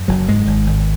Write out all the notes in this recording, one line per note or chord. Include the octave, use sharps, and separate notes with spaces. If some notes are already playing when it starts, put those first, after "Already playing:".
Already playing: F#2
F#1 F#3
G#2 G#3
G#1
G#1